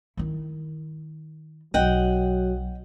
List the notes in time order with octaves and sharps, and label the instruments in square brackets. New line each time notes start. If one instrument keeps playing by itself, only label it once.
[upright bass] D#3 E4
[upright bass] B1 [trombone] F#3 [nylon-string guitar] D#5 F#5 G5